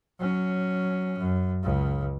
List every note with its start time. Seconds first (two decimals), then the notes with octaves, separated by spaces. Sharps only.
0.19 F#3 C#4
1.19 F#2
1.63 C#2 C#3